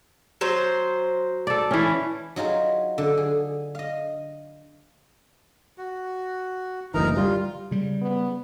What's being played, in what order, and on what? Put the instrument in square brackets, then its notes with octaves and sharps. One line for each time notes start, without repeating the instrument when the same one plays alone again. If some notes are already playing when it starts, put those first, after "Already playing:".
[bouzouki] F#3 C5
[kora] A4 D5
E3 C#4
[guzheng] F#3 D#4 F4 G#4
D3
G#4
D#5 F5
[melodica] F#4
[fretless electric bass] F#1 D2 E3 [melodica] D#4 A#4 A#5
[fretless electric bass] G3 [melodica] F4
[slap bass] C#3 G3
[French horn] B3